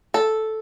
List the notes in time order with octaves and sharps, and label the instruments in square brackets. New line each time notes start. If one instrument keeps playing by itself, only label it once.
[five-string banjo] A4